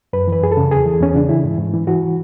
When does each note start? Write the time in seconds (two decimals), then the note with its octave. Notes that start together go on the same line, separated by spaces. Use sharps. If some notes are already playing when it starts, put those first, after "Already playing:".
0.13 F#2 B4
0.28 E3 B4
0.43 F#2 G#4
0.52 A4
0.57 C#3
0.72 E2 G#4
0.86 E3
1.00 E2 C#4
1.15 C#3 D4
1.29 E3 E4
1.44 G#2
1.58 G#2
1.74 E3
1.87 E3 F#4